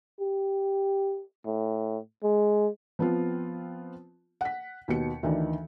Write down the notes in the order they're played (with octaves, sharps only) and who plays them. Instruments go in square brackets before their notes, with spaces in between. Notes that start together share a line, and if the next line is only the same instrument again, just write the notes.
[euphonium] G4
A2
G#3
[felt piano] F3 B3 C4 F4
F#5 B6
D#2 B2 C#7
D2 D#3 E3 D4